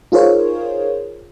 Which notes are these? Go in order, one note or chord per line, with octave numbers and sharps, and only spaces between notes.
D#4 F4 G#4 A#4 C5 C#5